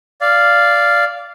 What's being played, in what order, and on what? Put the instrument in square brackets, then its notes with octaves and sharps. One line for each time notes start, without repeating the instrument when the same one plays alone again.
[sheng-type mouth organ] D5 F5